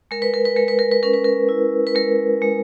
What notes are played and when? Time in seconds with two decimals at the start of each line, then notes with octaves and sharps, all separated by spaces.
0.11 G#3 A#4
0.22 B4
0.34 A#4
0.45 B4
0.56 G#3 A#4
0.68 B4
0.79 A#4
0.91 B4
1.03 C#4 A#4
1.14 B4
1.24 A#4
1.49 E4
1.87 B4
1.95 G#3 A#4
2.42 G#3